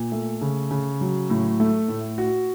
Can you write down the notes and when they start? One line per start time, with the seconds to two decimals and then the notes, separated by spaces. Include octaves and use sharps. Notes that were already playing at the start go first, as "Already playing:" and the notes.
Already playing: A#2
0.12 A3
0.41 C#3
0.71 C#3
1.01 F#3
1.30 A2
1.60 A3
1.89 A2
2.18 F#4